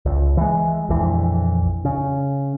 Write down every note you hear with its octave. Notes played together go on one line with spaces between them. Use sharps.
C#2
E3 G#3
A#1 F2 E3
C#3